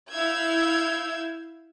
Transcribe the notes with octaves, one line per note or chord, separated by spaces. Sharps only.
E4 F5 E6 G6 G#6